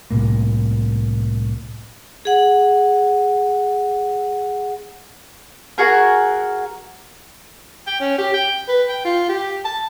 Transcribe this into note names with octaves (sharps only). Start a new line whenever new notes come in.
C2 A2 A#3
G#4 F#5
F#4 G#4 A#4
G5
C#4
G4
G5
B4
G5
F4
G4
A5